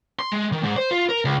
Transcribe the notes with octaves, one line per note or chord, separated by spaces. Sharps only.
C6
G#3
D#3
G#2
C5
F4
A#4
C#2